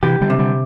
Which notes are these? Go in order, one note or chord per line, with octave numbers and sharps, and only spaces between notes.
C3 E3 G4
D3 G3
C3
D3 G3